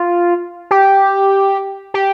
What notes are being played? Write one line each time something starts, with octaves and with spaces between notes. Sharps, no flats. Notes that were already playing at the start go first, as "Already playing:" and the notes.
Already playing: F4
G4
G4